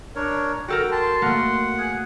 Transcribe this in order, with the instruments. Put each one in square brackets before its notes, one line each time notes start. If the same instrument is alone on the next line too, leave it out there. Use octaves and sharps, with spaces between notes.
[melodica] D4 A#4 C#5
[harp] F#4 A4 A#4 [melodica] G5
[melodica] A5 [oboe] C6
[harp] A3 A#3 [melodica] F#5
[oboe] G#4 [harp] F#6